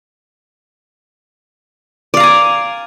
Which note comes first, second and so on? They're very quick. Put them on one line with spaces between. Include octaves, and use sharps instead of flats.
D5 F5 A#5 G#5